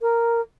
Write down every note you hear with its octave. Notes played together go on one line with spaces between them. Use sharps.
A#4